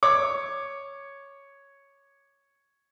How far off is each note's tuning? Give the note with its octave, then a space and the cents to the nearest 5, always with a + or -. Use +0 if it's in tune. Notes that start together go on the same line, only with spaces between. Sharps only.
C#5 +0 D6 +15